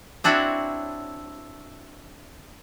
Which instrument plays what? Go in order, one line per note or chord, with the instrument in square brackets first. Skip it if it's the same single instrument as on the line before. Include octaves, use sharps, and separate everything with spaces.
[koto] C4 D4 E4 F#4 C#5